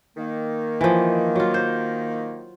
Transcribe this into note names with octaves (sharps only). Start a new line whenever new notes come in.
D#3 A#3
E3 F3
F#3 F4
C5